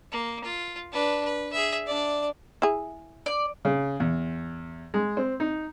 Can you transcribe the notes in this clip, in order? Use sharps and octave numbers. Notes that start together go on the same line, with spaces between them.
A#3
F4
D4 B4
B4
G#4 E5
D4 D5
E4 G#4
D5
C#3
E2
G#3
C4
D#4